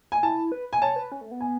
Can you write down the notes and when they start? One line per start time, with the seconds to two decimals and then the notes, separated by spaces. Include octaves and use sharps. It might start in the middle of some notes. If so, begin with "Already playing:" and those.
0.12 G#5
0.23 E4 A5
0.52 B4
0.73 G#5
0.82 C#5 A5
0.96 B4
1.12 C#4
1.21 A3
1.31 B3
1.41 G#5